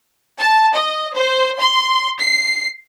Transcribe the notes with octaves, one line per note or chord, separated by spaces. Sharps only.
A5
D#5
C5
C6
C7